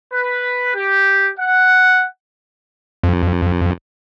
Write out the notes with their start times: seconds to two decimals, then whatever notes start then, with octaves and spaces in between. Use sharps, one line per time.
0.12 B4
0.74 G4
1.39 F#5
3.04 F2